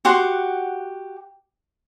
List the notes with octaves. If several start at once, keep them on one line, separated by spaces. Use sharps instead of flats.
F#4 G4 F#5 C6